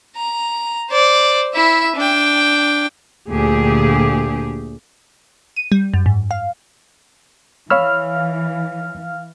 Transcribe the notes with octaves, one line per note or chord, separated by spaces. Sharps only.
A#5
C5 D5
E4 E5
D4 G5
D2 A#2 D3 G4 G#4
D#7
G3
F#2
G#2
F5
E3 C#5 F5 B5 E6 F6